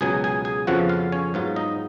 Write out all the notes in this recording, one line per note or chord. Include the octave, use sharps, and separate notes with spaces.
C#2 B2 F#3 G#4 G#5
G#4 G#5
G#4 G#5
F2 C#3 F3 B3 F4 F#4 F#5
F4 F5
C#4 C#5
G#2 F#3 B3 F4
D#4 D#5